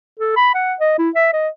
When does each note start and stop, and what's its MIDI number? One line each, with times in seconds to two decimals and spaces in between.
0.19 0.33 69
0.36 0.51 83
0.54 0.74 78
0.80 0.95 75
0.98 1.10 64
1.15 1.29 76
1.33 1.49 75